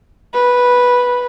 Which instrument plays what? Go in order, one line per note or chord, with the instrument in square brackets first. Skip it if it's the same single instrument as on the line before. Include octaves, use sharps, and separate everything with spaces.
[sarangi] B4